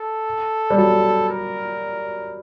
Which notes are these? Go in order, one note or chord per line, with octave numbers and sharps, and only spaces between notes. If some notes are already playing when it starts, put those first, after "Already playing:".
Already playing: A4
G3
F#3 A4
A#4